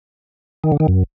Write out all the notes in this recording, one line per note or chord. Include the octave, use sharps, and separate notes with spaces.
D#3
D3
D#3
F#2